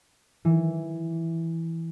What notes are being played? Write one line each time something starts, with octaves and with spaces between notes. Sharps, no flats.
E3